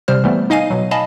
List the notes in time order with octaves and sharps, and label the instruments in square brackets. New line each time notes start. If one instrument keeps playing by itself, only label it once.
[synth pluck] C3 G3 C5 F6
E3 G3 A3 B3
D#4 D#5 F5 G#5 D#7
B2 F#3
D#5 F5 G#5 A5 B5